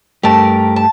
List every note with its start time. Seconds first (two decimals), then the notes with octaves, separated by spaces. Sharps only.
0.23 G2 A3 G4 A#4 A5
0.76 A5